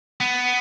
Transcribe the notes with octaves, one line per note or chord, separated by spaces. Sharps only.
B3